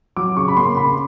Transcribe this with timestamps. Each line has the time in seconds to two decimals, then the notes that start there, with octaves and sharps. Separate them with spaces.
0.17 F#3 D6
0.37 C#3 C#6
0.48 B5
0.57 A#3 C6
0.77 C#3 B5
0.85 C6